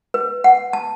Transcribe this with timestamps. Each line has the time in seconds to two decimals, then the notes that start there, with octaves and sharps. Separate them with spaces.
0.14 B4
0.44 F#5
0.73 A5